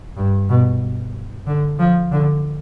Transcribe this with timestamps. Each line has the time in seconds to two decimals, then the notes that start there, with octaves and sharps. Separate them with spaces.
0.17 G2
0.49 B2
1.47 D3
1.80 F3
2.12 D3